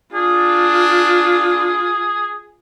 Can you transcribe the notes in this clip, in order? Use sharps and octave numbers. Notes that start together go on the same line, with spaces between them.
D4 F4 G#4